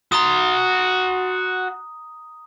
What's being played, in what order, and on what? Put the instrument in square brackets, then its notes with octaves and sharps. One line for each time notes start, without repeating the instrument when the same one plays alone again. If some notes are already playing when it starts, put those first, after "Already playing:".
[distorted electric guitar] F#4 C6 [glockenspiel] A#5 D#6